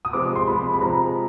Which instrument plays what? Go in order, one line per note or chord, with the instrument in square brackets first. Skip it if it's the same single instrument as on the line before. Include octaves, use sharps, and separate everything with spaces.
[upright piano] D#6
[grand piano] C3 F3 G#3 [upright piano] D6
[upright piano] C6
[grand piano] C3 F3 G#3 [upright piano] B5
[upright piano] B5
[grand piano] C3 F3 G#3 [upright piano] A#5